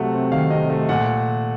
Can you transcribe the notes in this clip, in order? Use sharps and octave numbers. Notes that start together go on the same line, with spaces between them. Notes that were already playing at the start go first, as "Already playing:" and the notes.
Already playing: C3 F#3 A3 F#5
C4
D#3 F5
C3 D#5
A3 D#5
A#2 F#5